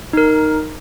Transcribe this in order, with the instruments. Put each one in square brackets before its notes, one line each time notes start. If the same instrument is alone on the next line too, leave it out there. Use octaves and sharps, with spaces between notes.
[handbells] D#4 A#4